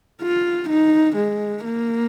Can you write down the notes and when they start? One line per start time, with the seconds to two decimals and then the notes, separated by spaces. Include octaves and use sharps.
0.22 F4
0.70 D#4
1.17 G#3
1.64 A#3